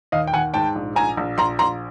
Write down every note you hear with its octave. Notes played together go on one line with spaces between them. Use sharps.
D#2 D#5 F5
G5
D#2 F#5 G#5
G#2 G5 A5
A#1
A#1 G#5 A#5
A#1
A#1 A#5 C6
A#1 A#5 C6